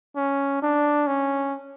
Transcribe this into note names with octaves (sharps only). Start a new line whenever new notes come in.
C#4
D4
C#4